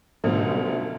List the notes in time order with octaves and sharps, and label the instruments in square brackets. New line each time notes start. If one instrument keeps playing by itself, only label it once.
[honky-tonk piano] C2 F#2 B2 D3 F3 A3